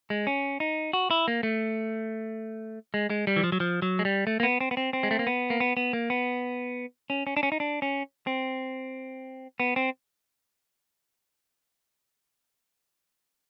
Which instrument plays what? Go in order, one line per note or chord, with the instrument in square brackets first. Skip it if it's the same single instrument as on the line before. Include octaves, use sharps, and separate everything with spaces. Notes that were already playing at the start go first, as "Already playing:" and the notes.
[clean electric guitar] G#3
C#4
D#4
F#4
E4
A#3
A3
G#3
G#3
G3
E3
F3
F#3
F3
F#3
G#3
G3
A3
A#3
B3
C4
B3
C4
C4
G#3
A3
A#3
B3
A#3
B3
B3
A#3
B3
C#4
C#4
D4
C#4
D#4
D4
C#4
C4
B3
C4